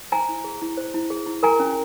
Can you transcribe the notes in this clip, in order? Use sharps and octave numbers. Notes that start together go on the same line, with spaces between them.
C5 G#5 A#5
E4
G#4
E4
C5
E4
G#4
E4
A#4 G#5 A#5
C#4